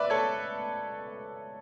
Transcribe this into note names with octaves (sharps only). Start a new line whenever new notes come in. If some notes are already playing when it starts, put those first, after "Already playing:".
Already playing: B4 D5 E5
A4 C#5